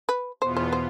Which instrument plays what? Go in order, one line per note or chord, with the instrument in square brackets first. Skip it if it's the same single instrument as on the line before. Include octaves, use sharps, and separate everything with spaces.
[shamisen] B4
[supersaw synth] E2 B2 B3 F4 [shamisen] C5
[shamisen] C5
C5